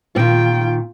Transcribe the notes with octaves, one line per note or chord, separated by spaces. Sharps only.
A#2 D#3 F4 G5